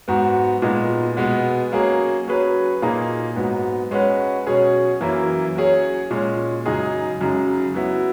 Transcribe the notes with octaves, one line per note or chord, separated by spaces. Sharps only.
G#2 F#3 B3 F#4
A#2 G#3 B3 D#4
B2 G#3 B3
F#3 A#3 C#4 G#4
F#3 C#4 G#4 B4
A#2 A#3 D#4 G#4
G#2 F#3 B3
G#3 C#4 F#4 B4
B2 F#3 C#4 G#4 C#5
F#2 E3 A#3 E4
F#3 C#4 G#4 C#5
A#2 G#3 C#4
F#2 C#3 G#3 D#4 G#4
F#2 C#3 G#3 D#4
F#3 B3 E4